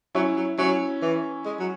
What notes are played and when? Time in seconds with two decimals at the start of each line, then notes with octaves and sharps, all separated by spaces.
0.15 F#3 C#4 E4
0.37 F#3
0.58 F#3 C#4 E4
1.02 E3
1.45 G#3
1.59 F#3